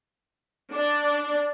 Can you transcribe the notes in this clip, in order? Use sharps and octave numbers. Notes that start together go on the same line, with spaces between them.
D4